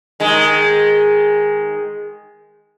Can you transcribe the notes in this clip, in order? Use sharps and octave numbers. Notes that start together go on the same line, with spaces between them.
D#3 G#3